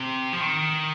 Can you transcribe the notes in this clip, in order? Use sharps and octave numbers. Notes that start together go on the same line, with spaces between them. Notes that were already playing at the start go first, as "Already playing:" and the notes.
Already playing: C3
F3
D#3